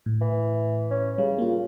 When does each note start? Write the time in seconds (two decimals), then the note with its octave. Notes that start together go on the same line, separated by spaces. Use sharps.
0.06 A2
0.21 E3
0.91 C#4
1.18 C#3 G3
1.38 A#3 F4